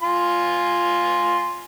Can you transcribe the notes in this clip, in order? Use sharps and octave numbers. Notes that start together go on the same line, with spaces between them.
F4 G#5 C6